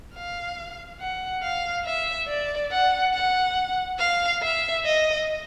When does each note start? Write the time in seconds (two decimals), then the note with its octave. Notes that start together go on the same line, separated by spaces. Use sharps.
0.15 F5
1.00 F#5
1.43 F5
1.85 E5
2.28 D5
2.71 F#5
3.14 F#5
3.99 F5
4.42 E5
4.85 D#5